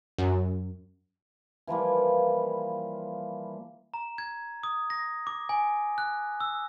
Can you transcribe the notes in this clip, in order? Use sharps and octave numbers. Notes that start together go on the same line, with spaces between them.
F#2
E3 F3 G3 A#3
A#5
G#6
D#6
A#6
D6
G#5
F#6
E6